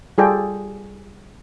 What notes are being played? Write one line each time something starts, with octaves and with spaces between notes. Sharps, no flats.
G3 F4 G#4 A4 D5 G5